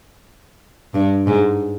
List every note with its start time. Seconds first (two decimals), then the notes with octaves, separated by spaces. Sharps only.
0.94 G2
1.27 G#2